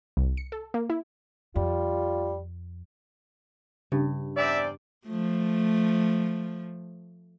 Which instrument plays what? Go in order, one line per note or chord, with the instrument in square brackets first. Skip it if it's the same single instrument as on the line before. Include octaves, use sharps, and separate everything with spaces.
[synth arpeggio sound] C2
C#7
A4
A#3
E4
[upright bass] F2 [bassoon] G3 [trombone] F4
[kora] G2 [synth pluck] C#3
[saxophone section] E2 C4 D5 [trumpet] E5
[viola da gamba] F3 A3